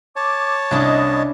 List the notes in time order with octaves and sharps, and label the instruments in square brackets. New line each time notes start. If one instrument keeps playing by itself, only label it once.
[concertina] C#5 A5 [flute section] D6
[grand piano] C2 [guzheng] C#4 D4 E4 [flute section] D#5 D#6